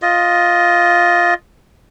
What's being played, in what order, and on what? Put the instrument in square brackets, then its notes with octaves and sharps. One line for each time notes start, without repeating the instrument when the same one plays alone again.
[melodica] F4 D#5